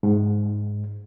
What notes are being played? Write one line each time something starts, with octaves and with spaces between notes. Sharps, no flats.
G#2